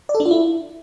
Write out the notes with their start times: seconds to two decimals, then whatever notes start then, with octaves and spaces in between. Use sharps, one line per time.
0.09 D5
0.15 A4
0.20 D4
0.25 F4
0.31 E4